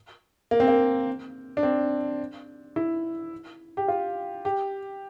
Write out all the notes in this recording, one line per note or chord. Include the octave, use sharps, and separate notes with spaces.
A#3
C4
A#3
D4
C4
E4
G4
F4
G4